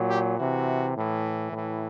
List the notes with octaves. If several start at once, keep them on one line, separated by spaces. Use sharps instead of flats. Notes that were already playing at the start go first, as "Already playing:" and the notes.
Already playing: A#2 F#3
G4
C3 E3 F#4
A2 E3
A2 E3